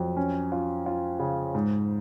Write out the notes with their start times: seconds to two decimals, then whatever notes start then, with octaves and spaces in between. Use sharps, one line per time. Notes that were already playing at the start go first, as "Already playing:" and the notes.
Already playing: F2 F#3
0.17 C#4
0.52 F4
0.86 F4
1.19 C#3
1.55 G#2